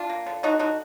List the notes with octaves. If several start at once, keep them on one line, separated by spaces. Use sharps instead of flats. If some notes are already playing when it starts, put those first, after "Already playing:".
Already playing: D4 F4
A#3
D3
D3 D#4 F#4
D3 D#4 F#4